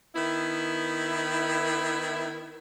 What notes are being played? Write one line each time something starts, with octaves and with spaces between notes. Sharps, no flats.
D#3 B3 E4